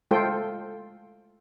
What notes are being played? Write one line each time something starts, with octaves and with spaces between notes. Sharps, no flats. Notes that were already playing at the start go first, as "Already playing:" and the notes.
G#3 A3 F4 A4 C5 G5